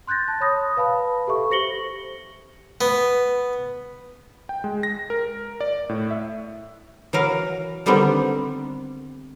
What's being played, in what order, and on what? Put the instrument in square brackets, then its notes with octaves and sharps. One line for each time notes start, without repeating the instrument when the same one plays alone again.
[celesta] C6 F#6 G6 A6 A#6
A5
C#5 B5 D#6 A#6
B4 F5 A5 B5
G4 A4 E5 C#6
G4 C5 A#6 C#7 F#7 G7
[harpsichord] B3
[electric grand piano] G5
G#3
A#6
A#4
D5
A2
E5
[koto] E3 F#3 A#4 F5
D3 D#3 G3 B3 C4 D4